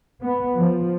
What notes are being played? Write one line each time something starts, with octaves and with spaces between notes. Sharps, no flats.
B3
F3